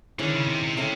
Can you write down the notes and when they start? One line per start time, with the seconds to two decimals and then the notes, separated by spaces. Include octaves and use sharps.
0.19 D3 D#3 G#3 C#4 E4
0.34 C#3
0.48 C3
0.63 C3
0.77 C3 A3 C#4 E4